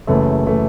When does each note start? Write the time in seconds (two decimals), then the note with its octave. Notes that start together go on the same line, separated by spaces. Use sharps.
0.07 F#1 F#2 E3 A3
0.46 E3 A3